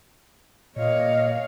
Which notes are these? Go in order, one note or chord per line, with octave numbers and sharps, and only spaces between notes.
A#2 C#5 D#5 F5